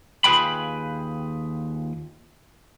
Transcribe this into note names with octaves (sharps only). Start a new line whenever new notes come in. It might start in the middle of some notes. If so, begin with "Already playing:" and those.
D#2 F4 G#4 B4 G5 B5